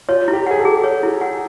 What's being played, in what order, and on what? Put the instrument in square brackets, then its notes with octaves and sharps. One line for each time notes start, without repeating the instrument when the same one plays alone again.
[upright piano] F4 [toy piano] C#5
[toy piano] E4
[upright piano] G4
[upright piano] G#4 [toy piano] F#5
[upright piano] A4
[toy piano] G#4
C#5
E4
F#5